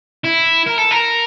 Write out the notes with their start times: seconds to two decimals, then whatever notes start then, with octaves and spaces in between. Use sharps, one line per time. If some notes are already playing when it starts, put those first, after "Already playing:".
0.25 E4
0.67 A#4
0.78 A4
0.92 A#4